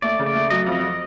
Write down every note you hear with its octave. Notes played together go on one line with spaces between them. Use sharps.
A3 D5
C#3
D5
A3
F#3 D#5
F2
D#5